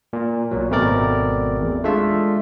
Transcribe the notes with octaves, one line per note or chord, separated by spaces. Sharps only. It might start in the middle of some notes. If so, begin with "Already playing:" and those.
A#2
B1 A#2 F#3
G#1 B2 A3 C4 A#4 D5
E2
G#3 A3 D4 F4 E5